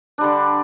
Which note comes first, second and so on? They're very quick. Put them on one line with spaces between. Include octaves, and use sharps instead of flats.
D4 G3 D3